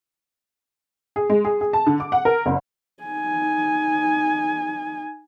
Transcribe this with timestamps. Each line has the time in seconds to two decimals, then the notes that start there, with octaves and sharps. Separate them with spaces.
1.16 G#4
1.30 G#3
1.45 G#4
1.61 G#4
1.73 A5
1.87 D3
2.00 D6
2.12 F#5
2.25 A#4
2.46 F#1
3.04 D#4 G#5